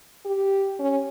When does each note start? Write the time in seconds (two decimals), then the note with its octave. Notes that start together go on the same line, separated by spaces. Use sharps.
0.25 G4
0.79 C#4